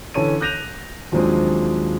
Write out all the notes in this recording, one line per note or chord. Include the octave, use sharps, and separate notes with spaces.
D3 E3 C#4 A4 C#5 D#7
F#6 G6 A#6 D#7 F7
D#2 F3 F#3 G#3 C4 D4